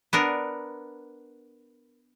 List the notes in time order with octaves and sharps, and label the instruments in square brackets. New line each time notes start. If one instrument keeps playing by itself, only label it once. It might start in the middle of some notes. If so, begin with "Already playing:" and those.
[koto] B3 D4 A#4